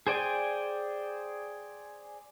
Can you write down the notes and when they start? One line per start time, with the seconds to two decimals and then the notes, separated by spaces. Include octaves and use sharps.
0.07 G#4 C5 D5 G5 G#5